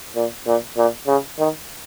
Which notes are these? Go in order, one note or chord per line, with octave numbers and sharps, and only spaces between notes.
A#2
A#2
A#2
C#3
D#3